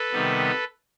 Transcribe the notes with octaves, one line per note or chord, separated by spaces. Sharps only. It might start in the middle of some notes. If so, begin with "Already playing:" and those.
Already playing: A4 B4
C3 D#3 G3 B3